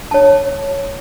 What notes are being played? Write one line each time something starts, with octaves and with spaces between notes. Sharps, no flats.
C#5 A5